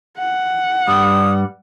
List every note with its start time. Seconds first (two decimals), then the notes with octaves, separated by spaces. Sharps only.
0.19 F#5
0.88 G2 G3 D#6